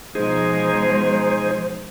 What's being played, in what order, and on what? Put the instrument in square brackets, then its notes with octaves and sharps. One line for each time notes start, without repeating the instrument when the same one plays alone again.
[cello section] B2 F3 G#3 [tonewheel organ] D#4 G#4 [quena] C5